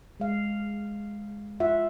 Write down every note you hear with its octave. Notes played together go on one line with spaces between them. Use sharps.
G#3 F5
F4 E5 F#5